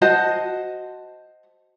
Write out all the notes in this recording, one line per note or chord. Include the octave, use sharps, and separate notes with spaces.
F#4 C5 D#5 A5